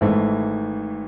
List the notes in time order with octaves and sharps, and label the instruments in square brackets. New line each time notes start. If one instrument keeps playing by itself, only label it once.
[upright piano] G#1 G#2 E3 A3